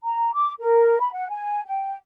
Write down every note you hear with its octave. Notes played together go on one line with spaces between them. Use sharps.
A#5
D6
A#4
B5
F#5
G#5
G5